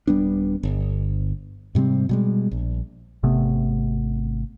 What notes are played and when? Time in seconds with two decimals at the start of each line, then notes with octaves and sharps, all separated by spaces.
0.07 D#1 G3 B3 D4
0.63 G1
1.75 G#2 C3 G3 C4
2.09 B2 G3 G#3
2.51 A#1
3.23 G#1 C3 A3 B3